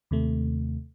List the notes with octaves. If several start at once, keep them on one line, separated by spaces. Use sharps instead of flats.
D#2 C3 A3